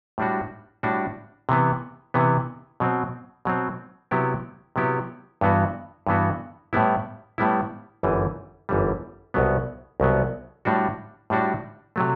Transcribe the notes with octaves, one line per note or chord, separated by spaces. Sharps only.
A2 G3 D4 F#4
A2 G3 D4 F#4
C3 E3 B3
C3 E3 B3
B2 F#3 C4
B2 F#3 C4
C3 F#3 B3 E4 G4
C3 F#3 B3 E4 G4
G2 E3 B3 F#4
G2 E3 B3 F#4
A2 G3 B3 E4
A2 G3 B3 E4
G1 F#2 E3 G3
G1 F#2 E3 G3
C2 B2 F#3 B3
C2 B2 F#3 B3
A2 G3 D4 F#4
A2 G3 D4 F#4
C3 F#3 A3